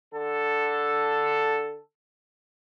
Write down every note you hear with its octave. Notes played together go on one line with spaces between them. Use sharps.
D3 A4